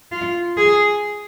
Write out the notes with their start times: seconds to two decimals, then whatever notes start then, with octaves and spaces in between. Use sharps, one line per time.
0.12 F4
0.57 G#4